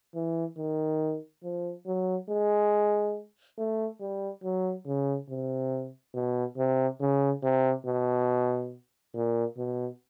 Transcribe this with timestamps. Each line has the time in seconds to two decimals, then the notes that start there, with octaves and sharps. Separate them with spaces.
0.15 E3
0.57 D#3
1.43 F3
1.86 F#3
2.29 G#3
3.58 A3
4.01 G3
4.43 F#3
4.86 C#3
5.29 C3
6.14 B2
6.57 C3
7.01 C#3
7.43 C3
7.86 B2
9.14 A#2
9.57 B2